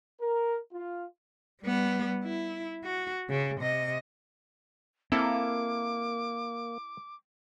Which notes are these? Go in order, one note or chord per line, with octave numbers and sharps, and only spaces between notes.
A#4
F4
G3 B3
E4
F#4
C#3
C3 D#5
A#3 C4 E4 A4 D6